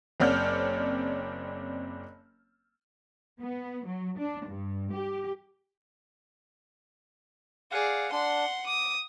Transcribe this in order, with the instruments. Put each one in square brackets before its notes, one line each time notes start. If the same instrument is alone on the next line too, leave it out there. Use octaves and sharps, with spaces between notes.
[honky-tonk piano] F#1 C4 C#5 D5 F6 G6
[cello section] B3
F#3
D4
G2
G4
[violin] G#4 D5 [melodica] F5 F#5
[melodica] D4 [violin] F#5 C6
[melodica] D6 [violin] D#6